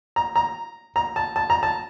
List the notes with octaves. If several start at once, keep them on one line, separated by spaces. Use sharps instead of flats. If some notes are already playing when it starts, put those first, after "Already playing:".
A#5
A#5
A#5
A5
A5
A#5
A5